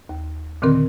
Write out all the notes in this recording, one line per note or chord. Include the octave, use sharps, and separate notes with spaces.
D#2
A#2 D3 D#3 C4 A#4